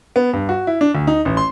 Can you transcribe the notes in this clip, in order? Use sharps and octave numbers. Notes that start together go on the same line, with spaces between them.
B3
G2
F#4
E4
D4
D2
D#4
A1
C6